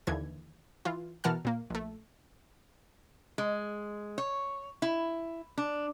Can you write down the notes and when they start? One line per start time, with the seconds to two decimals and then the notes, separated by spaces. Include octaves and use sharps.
0.07 D#2 D3 E3 G#6
0.85 E3 F4
1.24 B2 E3 A#4 F#5 A5 F6
1.45 A#2 A#3
1.70 A#1 A3
3.38 G#3
4.18 C#5
4.82 E4
5.58 D4